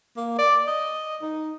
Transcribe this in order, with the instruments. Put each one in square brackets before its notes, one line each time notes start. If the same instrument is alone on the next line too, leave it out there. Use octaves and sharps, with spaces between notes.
[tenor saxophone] A#3
D5
D#5
D#4